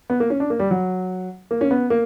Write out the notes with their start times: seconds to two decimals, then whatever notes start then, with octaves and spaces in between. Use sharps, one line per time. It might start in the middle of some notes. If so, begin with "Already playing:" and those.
0.10 B3
0.20 A#3
0.30 C#4
0.40 D4
0.50 A#3
0.59 G3
0.71 F#3
1.51 A#3
1.61 C#4
1.71 B3
1.90 A#3